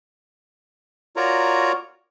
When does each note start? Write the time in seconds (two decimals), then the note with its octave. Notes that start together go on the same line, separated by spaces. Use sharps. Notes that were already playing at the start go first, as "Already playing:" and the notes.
1.16 F4 F#4 A#4 C#5 D5 A#5